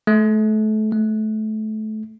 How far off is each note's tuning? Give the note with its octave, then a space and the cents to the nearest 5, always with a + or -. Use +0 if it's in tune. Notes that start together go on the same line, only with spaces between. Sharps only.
A3 -30
A3 -25